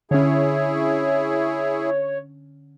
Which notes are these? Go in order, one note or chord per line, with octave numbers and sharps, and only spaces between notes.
D3 C#4 E4 G#4 C#5